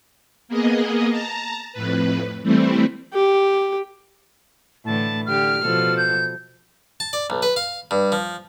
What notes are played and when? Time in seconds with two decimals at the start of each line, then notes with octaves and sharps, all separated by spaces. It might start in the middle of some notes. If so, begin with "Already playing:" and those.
0.48 A#3 B3 G#4 D#5
1.10 A5 A#5
1.73 F2 A2 B4
2.42 E3 G3 A3 C4 E4
3.13 G4
4.85 A2 D3 E3 A5
5.26 D3 G4 F6
5.61 B2 F3 A4
5.97 G6
7.00 A5
7.13 D5
7.30 B1
7.42 B4
7.56 F5
7.91 G2
8.12 F3